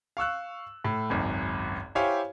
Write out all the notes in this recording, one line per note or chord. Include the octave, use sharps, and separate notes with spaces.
F5 C#6 E6 F#6
A2
G#1 C#2 F#2
E4 G4 C5 C#5 F5 G#5